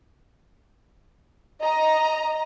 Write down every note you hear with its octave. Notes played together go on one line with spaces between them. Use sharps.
D#5 A#5